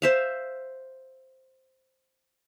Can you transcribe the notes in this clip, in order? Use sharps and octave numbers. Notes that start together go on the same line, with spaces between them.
C5 E5 F5